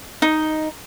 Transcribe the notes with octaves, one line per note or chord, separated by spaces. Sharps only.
D#4